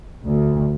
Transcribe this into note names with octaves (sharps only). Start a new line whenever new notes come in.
D2